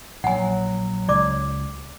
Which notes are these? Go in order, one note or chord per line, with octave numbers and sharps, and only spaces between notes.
A#1 F#3 F#5 G#5
C#2 D5 D6